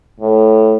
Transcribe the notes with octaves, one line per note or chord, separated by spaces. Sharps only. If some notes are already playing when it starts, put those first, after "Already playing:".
A2